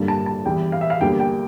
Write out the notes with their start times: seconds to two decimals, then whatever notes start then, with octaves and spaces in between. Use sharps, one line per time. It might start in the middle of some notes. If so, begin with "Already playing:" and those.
Already playing: G2 D3 G3 A#3
0.08 A5
0.26 A5
0.45 E2 E3 G3 G5
0.72 F5
0.81 E5
0.90 F5
1.01 E2 D3 G3 A#3 G5
1.20 G5